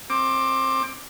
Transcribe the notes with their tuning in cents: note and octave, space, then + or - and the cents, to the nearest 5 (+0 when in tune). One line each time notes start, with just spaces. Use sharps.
C4 +25 D6 +10